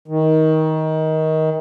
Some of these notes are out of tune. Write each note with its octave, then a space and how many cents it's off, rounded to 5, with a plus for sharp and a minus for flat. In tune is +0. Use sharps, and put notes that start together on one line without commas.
D#3 +20